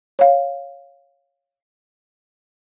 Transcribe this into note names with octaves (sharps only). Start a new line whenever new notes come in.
C#5 F5